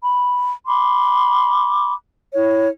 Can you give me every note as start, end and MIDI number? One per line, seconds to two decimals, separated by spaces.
0.02 0.51 83
0.67 1.94 83
0.67 1.94 84
0.67 1.94 86
2.33 2.68 64
2.33 2.68 73